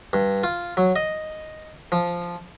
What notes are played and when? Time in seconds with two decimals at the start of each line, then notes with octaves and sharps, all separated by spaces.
0.13 G2
0.44 F4
0.77 F#3
0.96 D#5
1.92 F3